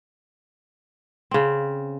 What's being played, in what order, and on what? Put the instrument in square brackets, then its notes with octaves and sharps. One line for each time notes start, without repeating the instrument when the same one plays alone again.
[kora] C#3 C4